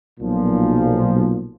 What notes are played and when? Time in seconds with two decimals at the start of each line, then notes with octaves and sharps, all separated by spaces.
0.19 B1 A#2 F3